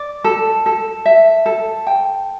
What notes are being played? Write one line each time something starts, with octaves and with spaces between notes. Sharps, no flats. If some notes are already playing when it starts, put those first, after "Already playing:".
Already playing: D5
A4
A4
E5
A4
G5